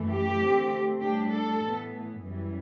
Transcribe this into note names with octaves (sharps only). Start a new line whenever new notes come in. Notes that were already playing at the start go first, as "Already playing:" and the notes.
Already playing: F#2 E3 A3
G4
D3 A3 C4
A2 G3 D4 G4
A4
A2 E3 B3
F#2 E3 G3